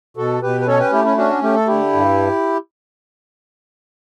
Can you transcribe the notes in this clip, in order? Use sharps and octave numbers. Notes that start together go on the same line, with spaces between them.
B2 F#4 A4
B2 G4 B4
B4
C#4 A4 C#5
G4 B4
A3 E4 G4
C#4 E4
C#4 D4 F#4
A3 G4
A4
D3 E4 G4
G2